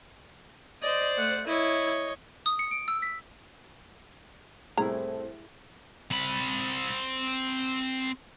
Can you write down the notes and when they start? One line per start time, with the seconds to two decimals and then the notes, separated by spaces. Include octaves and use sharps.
0.82 C5 D5 D#5
1.17 A3 F#5
1.47 E4 C#5 D#5
2.46 D#6
2.59 C#7
2.71 D7
2.88 E6
3.02 B6
4.77 C2 A2 E4 G#4 A4 C5 A#5
6.11 C4 B5